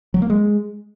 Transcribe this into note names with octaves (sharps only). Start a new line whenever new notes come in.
F#3
A#3
G#3